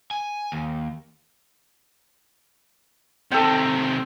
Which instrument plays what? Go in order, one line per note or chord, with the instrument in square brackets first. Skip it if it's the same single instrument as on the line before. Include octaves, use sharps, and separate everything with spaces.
[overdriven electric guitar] G#5
D#2
[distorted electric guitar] C3 D#3 [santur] A4 G5